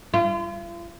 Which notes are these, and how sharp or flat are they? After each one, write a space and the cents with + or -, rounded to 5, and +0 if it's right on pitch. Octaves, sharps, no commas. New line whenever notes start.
F4 -40